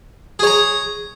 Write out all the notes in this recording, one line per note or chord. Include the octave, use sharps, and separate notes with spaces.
G#4 C#5 A#5